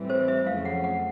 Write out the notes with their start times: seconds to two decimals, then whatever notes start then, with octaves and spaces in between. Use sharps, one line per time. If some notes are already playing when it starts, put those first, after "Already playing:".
Already playing: A2 E3 G3 C4
0.10 C5
0.28 E5
0.47 F2 C#3 F#3 A3 F5
0.65 F#5
0.84 F#5